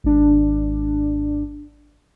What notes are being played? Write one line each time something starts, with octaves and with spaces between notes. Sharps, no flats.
G#1 D4